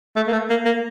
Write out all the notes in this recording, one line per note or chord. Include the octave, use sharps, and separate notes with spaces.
A3
A#3
A3
A#3
A#3